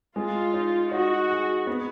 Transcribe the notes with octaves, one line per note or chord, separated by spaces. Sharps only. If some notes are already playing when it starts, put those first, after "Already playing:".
G#3 F4
D#4
D#4 F#4
G#4
B3